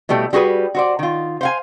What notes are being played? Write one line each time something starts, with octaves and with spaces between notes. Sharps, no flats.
B2 G3 A3 E4
G3 F#4 G#4 B4
F#4 C5 D5
D#3 F4
C5 F5 G#5